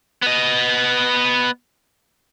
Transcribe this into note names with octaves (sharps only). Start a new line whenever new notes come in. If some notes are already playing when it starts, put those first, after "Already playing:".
B3 D#5